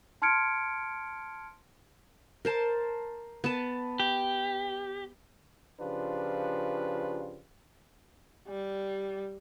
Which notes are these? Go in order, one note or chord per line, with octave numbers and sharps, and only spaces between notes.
A5 C6 F6 G#6 C#7 D7
A#4 C5 A5
B3 A5
G4
C#3 F3 D4 F4 G4 B4
G3